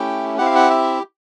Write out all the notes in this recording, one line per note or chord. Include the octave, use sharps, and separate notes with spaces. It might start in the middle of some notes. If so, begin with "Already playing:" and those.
Already playing: A3 C#4 E4 G4 G5
C4 E4 G4 F#5
F5
F#5
E5